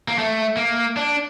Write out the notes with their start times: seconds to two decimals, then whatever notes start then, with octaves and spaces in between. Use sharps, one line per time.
0.08 A#3
0.18 A3
0.57 A#3
0.97 D4